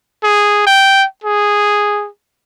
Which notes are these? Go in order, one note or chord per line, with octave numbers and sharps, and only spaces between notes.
G#4
G5
G#4